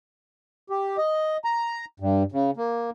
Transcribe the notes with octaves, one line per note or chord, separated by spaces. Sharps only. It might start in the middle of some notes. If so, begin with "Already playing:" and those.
G4
D#5
A#5
G2
C#3
A#3